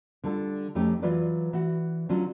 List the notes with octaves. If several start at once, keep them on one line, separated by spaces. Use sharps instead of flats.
D3 G3 F4 A4
F2 A3 C#4 D#4 G4
E3 F#3 F4 B4 D5
E3 F#4 F#5
D3 F#3 C#4 F4